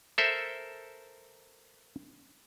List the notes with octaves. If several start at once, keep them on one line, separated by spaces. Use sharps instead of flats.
A4 A#4 C5 E5